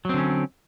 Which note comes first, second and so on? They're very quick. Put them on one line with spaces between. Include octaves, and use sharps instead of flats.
F#3 C4 D3 C#4